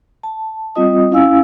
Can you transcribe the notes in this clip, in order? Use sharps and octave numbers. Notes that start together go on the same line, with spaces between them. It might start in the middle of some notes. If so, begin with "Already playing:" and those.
A5
G3 C4 F4 D#5 D#6
C#4 E4 F5 G#5 E6